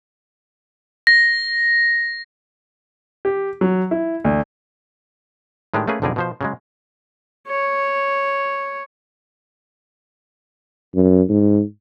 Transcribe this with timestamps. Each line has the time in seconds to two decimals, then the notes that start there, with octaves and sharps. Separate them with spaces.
1.07 A#6
3.25 G4
3.61 F#3
3.91 E4
4.24 D2
5.74 A2 D#3 G#3 D4 G4
5.87 A3 A#3 C#4 G#4 B4
6.02 B1 F2 D3 G3 G#4 A#4
6.16 B2 F3 C5
6.41 C#3 F#3 G#3
7.48 C#5
10.95 F#2
11.29 G#2